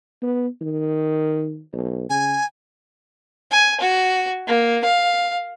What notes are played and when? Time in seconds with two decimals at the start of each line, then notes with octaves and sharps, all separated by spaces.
0.22 B3
0.61 D#3
1.73 B1
2.10 C#3 G#5
3.51 G#5
3.81 F#4
4.48 A#3
4.85 F5